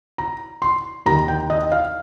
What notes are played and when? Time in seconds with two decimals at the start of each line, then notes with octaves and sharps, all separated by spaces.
0.18 A#5
0.62 C6
1.06 D#2 A#5
1.11 D#3
1.28 G5
1.50 D#5
1.72 F5